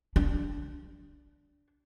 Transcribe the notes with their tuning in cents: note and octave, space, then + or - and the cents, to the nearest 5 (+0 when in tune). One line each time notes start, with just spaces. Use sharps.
D4 -15